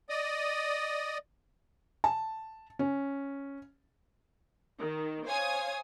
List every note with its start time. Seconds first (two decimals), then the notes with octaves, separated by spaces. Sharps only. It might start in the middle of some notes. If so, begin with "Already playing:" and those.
0.09 D5 D#5 D#6
2.04 A5
2.79 C#4
4.79 D#3
5.26 C5 C#5 F5 G#5 D#6 G#6